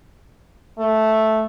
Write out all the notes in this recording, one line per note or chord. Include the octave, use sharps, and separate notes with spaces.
A3